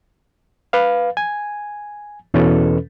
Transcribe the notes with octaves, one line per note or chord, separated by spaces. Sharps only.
B4 F5
G#5
E2 B2 E3 C#4 A4 B4